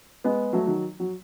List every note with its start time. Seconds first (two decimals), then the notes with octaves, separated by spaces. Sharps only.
0.24 G#3 B3
0.53 F#3 A3
0.67 D#3 F#3
1.00 F#3